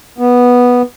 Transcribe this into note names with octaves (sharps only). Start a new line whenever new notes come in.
B3